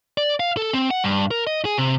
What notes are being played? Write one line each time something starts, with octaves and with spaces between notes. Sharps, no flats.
D5
F5
A4
C4
F#5
G2
A#4
D#5
G#4
C3